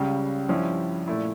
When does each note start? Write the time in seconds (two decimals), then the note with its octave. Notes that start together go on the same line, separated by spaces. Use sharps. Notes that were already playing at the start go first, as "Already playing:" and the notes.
Already playing: C#2 C#3 G3
0.49 G2 F3 C#4 E4
1.08 A#2 A3 E4